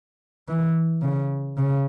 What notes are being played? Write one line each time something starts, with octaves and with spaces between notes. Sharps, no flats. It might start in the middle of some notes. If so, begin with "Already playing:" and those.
E3
C#3
C#3